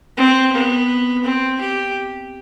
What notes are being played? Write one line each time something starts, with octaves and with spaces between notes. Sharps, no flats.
C4
B3
C4
G4